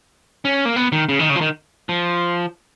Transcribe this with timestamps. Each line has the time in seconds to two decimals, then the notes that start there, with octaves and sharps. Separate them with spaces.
0.45 C#4
0.65 A#3
0.76 B3
0.92 D#3
1.09 C#3
1.19 D#3
1.30 C#3
1.36 F3
1.41 D#3
1.89 F3